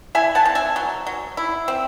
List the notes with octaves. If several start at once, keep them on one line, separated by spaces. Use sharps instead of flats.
E4 E5 G#5
F#5 A5
C4
E5 G#5
F#3
F#3
E4
C4